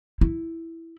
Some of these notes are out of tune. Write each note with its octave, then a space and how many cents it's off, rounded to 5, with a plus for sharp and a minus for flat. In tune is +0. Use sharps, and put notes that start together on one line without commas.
E4 +0